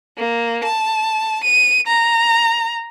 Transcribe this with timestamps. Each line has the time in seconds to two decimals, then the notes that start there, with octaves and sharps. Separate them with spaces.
0.18 A#3
0.64 A5
1.44 D#7
1.87 A#5